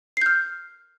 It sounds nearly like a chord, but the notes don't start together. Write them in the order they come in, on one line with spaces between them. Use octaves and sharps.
C7 G6 F6